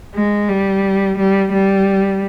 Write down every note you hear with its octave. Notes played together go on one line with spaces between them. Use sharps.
G#3
G3
G3
G3